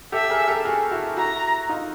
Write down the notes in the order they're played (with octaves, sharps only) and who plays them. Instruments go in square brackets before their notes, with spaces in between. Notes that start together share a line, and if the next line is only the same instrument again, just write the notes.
[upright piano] G4 A4 [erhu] E5
[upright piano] G#4 A#4
G4 A4
F#4 G#4
E4 F#4
[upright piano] E4 F#4 [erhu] A#5
[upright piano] D#4 F4